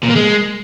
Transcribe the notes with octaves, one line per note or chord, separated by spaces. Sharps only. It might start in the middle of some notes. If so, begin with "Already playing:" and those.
A#2
A#3
G#3